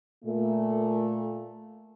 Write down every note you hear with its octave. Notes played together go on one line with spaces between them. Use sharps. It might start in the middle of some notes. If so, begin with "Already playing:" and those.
A#2 A3